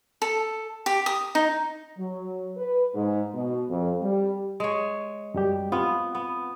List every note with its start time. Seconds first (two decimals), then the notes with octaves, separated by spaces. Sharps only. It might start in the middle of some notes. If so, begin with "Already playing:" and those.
0.22 A4
0.86 G4
1.06 D#6
1.35 D#4
1.98 F#3
2.57 B4
2.95 G#2
3.34 B2
3.69 F2
4.02 G3
4.60 G#3 C#5
5.34 F#2 G3 G4
5.72 B3 C4 F4 F#5
6.15 B3